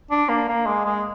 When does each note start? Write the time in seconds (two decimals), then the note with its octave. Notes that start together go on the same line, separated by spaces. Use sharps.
0.11 D4
0.29 A#3
0.49 A#3
0.66 G#3
0.85 G#3